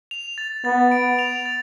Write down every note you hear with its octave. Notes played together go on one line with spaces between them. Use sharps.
F7
A6
B3 A6
D7
F7
A6